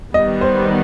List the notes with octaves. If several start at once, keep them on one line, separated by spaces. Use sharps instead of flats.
D#3 G3 B3 D#5
C5